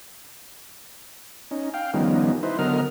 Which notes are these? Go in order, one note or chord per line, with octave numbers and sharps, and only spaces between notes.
C#4 D#4
F5 G5
D#3 F3 G3 B3 C#4 D#4
D#4 E4 B4 C5
D3 F#3 B3 A#4 D#5 F6